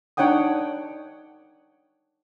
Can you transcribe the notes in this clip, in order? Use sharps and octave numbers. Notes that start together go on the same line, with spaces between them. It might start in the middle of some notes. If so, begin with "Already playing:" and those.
D4 D#4 C#5 F#5 G5 D#6